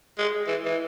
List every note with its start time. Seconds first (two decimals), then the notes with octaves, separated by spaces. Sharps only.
0.18 G#3
0.47 E3
0.65 E3